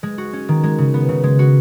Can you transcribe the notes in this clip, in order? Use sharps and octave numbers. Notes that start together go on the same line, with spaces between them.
G#3
F#4
C#4
D#3
G#3
C#3
B3
C#3
G#3
F#4